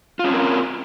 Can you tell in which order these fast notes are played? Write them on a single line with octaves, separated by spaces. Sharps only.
F4 C#4 C4 A#4